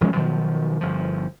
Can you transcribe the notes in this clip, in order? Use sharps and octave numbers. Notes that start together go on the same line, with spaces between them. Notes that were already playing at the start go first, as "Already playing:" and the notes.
E1 F3 G#3 C#4
B2 D#3 F3 F#3
G1 F3